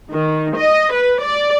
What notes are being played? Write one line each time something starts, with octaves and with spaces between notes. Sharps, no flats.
D#3
D#5
B4
D5